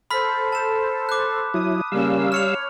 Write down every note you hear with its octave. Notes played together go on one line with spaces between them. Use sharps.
A4 C5 B5 F6 B6
A5 E7
D6 F#6
F#3 E4 D#6
C#3 G3 A#3 C#4 F5 E6
C#5 F6 C#7 F7